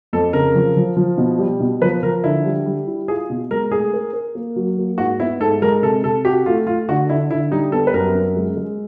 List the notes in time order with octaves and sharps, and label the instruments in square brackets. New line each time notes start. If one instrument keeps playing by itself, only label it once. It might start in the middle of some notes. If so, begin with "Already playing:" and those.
[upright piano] F2 [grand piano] A4
[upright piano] C#3 [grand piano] A#4
[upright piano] F3
F3
F3
B2
G3
B2
[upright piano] F3 [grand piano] B4
[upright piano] F3 [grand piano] A#4
[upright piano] D3 [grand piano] E4
[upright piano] G3
G3
E4
[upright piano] F4 [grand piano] G#4
[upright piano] B2
[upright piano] G#3 [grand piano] A#4
[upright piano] A3 [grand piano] G#4
[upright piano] A#4
A#4
A#3
F#3
A#3
[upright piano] G#2 [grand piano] F#4
[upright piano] B3 [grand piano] E4
[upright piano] G#2 [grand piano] A4
[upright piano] G#3 [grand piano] A#4
[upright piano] C3 [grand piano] A4
[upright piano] C3 [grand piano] A4
[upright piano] F#4 [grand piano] G4
[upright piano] A3 [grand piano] F4
[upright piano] A3 [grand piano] F4
[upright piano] D3 [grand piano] F#4
[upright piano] D3 [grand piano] E4
[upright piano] D3 [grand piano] E4
[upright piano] G3 [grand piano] D#4
[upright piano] B3 [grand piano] A4
[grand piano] B4
[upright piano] F#2 [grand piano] A#4
[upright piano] C#4
G#3
G#3